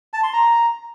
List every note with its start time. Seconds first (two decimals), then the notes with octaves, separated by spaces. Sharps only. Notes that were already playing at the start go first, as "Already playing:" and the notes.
0.14 A5
0.23 C6
0.33 A#5